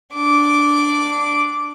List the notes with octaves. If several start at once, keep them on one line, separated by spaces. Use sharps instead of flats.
D4 D6